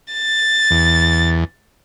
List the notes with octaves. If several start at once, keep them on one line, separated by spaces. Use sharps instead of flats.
A6
E2